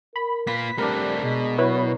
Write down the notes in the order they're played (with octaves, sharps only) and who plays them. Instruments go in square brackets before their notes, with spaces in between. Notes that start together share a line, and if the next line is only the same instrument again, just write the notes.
[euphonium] A#4 [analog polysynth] B5
[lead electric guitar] A#3 F4 [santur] B4 [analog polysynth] B6
[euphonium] G3 [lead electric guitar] A3 C4 [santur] D4 A#4
[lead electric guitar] B2 [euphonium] G#3
[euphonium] F#3 [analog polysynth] E4 B4 C#5